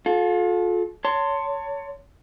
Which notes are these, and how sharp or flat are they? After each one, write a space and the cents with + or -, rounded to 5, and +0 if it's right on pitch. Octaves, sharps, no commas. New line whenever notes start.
F4 +35 A4 -30
C#5 +20 A5 +30 C6 +0